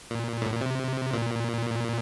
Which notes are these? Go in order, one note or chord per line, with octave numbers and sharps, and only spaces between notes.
A#2
A2
A#2
C3
A#2